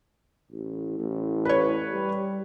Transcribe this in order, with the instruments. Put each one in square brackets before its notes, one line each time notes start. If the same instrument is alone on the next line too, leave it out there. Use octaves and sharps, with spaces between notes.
[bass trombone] A1
A1
[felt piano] B4 C#5
[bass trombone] G3